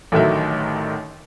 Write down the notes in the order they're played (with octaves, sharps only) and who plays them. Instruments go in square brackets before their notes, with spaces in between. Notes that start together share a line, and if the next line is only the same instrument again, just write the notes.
[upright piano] A1 A2 D3 D#3 F#3 E5